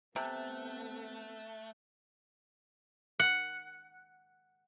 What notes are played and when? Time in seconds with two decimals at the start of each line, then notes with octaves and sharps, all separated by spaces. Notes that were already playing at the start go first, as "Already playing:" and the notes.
0.16 C3 A3 B3 C4 A5 E6 F#6
3.20 F#5